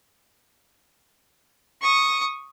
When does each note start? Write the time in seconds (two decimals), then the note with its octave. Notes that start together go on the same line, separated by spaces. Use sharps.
1.82 C#6 D#6